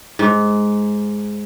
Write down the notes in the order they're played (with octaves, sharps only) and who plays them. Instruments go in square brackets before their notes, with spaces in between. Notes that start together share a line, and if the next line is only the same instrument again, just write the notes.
[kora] G#2